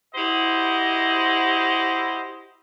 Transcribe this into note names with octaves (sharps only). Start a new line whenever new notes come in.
E4 F#4 G4 C5 D#5